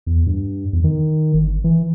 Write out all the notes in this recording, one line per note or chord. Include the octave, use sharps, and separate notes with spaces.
E2
G2
E2
D#3
G1
E3